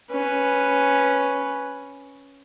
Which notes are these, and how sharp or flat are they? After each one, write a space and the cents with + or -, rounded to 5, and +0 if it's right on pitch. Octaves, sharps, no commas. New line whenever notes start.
C#4 +0 B4 +0